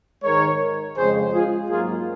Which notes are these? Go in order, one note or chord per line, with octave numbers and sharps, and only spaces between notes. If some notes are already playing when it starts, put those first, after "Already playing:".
G#2 D#3 G#3 A#4 C#5
F2 C#3 G#3 G#4 C5
F4 G#4
G#2 F#3 A#3 C#4 F4 G#4